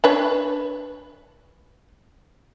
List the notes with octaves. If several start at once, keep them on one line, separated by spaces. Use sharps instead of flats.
D4 B4 C#5